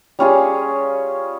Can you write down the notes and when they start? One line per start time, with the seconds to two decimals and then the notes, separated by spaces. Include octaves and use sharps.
0.19 G3 C#4 F4 G#4